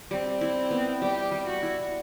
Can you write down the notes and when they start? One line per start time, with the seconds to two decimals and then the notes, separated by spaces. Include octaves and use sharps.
0.11 G3 C4
0.41 E4
0.71 B3
1.01 G3 G4
1.32 G3
1.47 F#4
1.63 E4